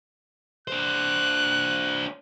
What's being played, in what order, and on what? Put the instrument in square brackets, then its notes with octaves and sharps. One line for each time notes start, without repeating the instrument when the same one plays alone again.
[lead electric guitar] D4 C5 [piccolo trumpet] F#6